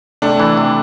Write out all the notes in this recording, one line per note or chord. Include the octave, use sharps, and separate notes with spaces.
C3 A3 D4
E3
C3